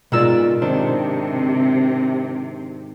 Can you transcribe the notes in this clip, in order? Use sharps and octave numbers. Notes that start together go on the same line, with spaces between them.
G#2 B2 F4 A#4 D5 E6
C3 D#3 D4 C5